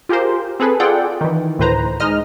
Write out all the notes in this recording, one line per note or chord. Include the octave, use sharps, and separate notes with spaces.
F4 G4 G#4 A#4 C5
C4 G#4 A4 B4
F4 G#4 A4 D5 F#5 G5
D#3 E3
D2 A2 D#3 B4 C5 A#5
G#3 D#4 D#5 F6